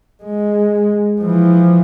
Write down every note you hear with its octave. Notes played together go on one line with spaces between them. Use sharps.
G#3
E3 F3